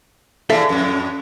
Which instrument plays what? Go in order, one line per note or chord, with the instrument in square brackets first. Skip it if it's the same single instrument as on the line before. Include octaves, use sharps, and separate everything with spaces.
[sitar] E2 E3 [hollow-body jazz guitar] A4 E5 F5
[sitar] F2 A2